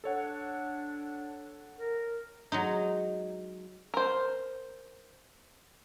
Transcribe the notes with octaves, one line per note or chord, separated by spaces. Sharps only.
D4 A4 C#5 F#5
A#4
F#3 G#3 D#4
A#4 C5